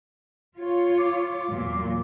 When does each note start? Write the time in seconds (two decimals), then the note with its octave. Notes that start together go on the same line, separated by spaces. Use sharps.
0.57 F4 C#5
0.98 D6
1.51 E2 A#2 F#3